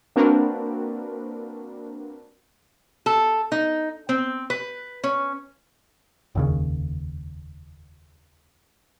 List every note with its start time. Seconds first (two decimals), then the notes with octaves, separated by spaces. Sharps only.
0.16 A#3 C4 D4 F#4 A#4 B4
3.06 A4
3.52 D#4
4.09 C4
4.50 B4
5.04 C#4
6.35 F1 D#2 C#3